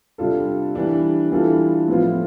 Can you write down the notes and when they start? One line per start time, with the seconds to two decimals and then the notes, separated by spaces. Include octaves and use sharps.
0.18 C3 G3 D4 F4 A4
0.75 E3 G3 D4
1.32 E3 G3 D4 F4 A4
1.88 A2 F3 B3 F4